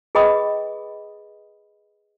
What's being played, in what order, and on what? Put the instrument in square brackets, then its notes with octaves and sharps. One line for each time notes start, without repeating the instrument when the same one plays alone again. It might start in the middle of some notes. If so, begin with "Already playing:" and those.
[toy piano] G#4 B4 D#5 G5 B5 D#6